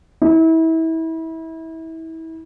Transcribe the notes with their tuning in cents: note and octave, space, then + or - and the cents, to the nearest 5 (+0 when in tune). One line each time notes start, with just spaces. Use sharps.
E4 -30